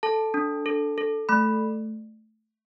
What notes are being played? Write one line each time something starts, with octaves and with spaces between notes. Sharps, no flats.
A4 A5
D4
A4
A4
A3 B5